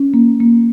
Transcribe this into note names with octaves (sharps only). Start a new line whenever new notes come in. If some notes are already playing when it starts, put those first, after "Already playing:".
Already playing: C#4
A#3
A#3